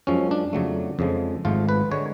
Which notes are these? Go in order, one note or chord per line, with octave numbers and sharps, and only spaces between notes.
F#2 F3 G#3 C#4
D4
F2 C#3 F#3 A3
F2 C#3 F3 G#3
G#1 G#2 F3 A3 F4
B4
D3 G#3 C#5